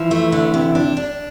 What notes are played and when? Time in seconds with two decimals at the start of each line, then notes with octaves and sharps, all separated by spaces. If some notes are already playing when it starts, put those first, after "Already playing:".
Already playing: E3 F3 E4
0.11 A3
0.32 D3
0.54 C3
0.75 D4
0.97 D4